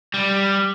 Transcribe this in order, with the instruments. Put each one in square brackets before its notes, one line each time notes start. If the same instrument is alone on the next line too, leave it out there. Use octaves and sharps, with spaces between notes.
[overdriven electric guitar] G3